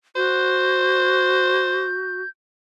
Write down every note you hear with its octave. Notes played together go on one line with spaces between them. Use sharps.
F#4 C5 G6